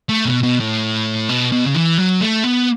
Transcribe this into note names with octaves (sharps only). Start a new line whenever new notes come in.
A3
B2
B2
A2
B2
B2
C#3
E3
F#3
A3
B3